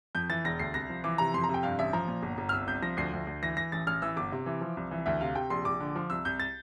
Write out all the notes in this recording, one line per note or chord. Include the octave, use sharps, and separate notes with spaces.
F2 G6
E3 A6
E1 A#6
D2 C7
C2 A#6
F3
E3 D6
C3 A#5
F2 C6
A#5
C3
G5
G2 F5
A1 E5
F3 A#5
A#2
G1
G1
F6
C2 E6
C2 G6
F3 A#6
D2 C7
D2
D2
E3 A#6
E3 A#6
A1 A6
A1 F6
E3 E6
G1 D6
C3
E3
F3
C2
E3
D2 E5
C3 F5
C3 G5
A#1 C6
A#1 D6
D3
F3
C2 E6
C2 G6
A6